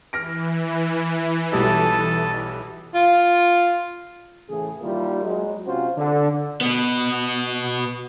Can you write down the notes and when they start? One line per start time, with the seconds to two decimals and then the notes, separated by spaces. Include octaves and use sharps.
0.13 E3 F6 A#6 D7
1.52 B1 G3 F#4 A4 D#5 A5
2.94 F4
4.48 A2 C#3 E3 G#4
4.81 D#2 D#3 G3 A#3 E4 F4
5.23 F#3 G#3
5.66 C3 C#4 F4 F#4 C5
5.97 D3
6.61 B2 B3